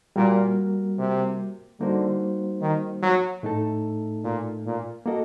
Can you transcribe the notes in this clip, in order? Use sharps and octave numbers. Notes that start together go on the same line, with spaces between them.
A#2 G3 A#3 F#4 A#4
C3
D3 G3 A#3 D#4 F#4 C5
D#3
F#3
A2 A3 D#4 A4
A#2
A#2
A#3 F#4 A4 D#5